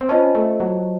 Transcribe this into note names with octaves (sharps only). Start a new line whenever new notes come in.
C4
C#4 F4 C5 D#5 A5
A3
F#3